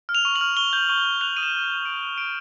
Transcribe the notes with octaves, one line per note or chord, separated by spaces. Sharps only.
F6
F7
C#6
F#7
F6
C#6 G7
G6
C#6
C#6
F#6 F7
D#6 D#7
E7
F#6
D#7
F#6
F#6 D7
F#6
D#6 D7